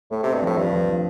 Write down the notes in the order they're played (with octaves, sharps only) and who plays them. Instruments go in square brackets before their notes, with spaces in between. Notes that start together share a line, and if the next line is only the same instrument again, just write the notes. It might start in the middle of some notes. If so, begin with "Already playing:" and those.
[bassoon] A2 [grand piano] A3
[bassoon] C3 [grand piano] C4
[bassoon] G2
[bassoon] A2 [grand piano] F3
[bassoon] G2 [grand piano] F3
[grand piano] F3
F3